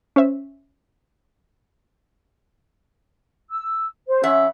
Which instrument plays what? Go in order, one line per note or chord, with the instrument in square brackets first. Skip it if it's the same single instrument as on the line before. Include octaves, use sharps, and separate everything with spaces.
[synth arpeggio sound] C#4 C5 E5
[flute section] E6
C5
[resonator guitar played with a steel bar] F2 E5 F#5 [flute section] C#4 E6